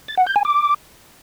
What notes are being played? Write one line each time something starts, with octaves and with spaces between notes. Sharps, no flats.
A6
F#5
G6
G#5
D6